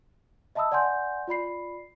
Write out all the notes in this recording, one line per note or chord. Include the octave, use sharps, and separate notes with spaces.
D#5 E5 A5 B5 D#6 E6
D5 F#5 G#5 C6 G6
F4 D5 B5 C7